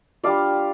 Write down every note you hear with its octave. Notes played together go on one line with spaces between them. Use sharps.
G3 D4 F4 D5 F5